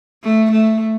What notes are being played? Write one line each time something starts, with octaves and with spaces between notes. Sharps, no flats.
A3
A3